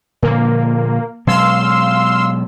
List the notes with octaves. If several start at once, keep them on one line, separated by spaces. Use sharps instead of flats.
A#2 D3 F3 A#3
B2 F#3 G#3 F5 C6 E6